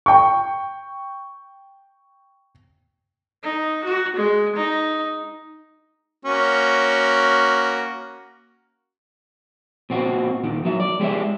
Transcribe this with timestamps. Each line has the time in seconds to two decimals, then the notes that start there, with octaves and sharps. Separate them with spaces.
0.06 G5 C#6
3.43 D#4
3.84 F#4
4.16 G#3
4.56 D#4
6.25 A#3 C#4 F#4
9.90 A#2 C4 F#4
10.44 D#2 A#2 D#3
10.65 F#3 E5
10.80 D5
11.00 G#3 G4 C5 D5 E5